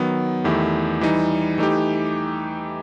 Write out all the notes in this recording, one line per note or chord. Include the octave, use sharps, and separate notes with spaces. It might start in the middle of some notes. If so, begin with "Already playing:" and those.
Already playing: D#3 F#3 B3
E2 D#3 A3 E4 G4
E3 G3 D#4
E3 A3 D#4 G4